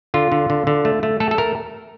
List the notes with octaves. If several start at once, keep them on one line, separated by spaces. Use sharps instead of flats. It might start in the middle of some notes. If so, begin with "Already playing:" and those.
D3 F4
D3
D3
D3
A3
A3
A3 A4
A4
A3 A#4